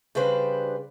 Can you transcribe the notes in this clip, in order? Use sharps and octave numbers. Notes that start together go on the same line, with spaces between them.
C#3 G3 D4 G4 B4 C5